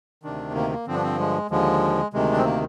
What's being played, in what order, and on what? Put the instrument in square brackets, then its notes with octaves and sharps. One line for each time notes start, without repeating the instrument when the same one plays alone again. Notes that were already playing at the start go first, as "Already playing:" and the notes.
[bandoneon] D2 C3 D#3 D4
A#3
A#3
G2 D3 F3 C4
D4
C4
G#3
D#2 D3 F3 G#3
D2 C3 D#3 G#3
D4
C4
A#3